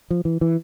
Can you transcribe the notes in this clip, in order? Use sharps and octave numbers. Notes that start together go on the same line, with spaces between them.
F3
E3
E3